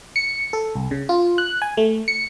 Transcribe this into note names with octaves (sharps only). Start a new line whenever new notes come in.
C#7
A4
C2
C#3
F4
F#6
G#5
A3
C#7